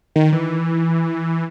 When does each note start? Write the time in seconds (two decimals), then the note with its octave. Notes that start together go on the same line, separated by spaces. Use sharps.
0.16 D#3
0.33 E3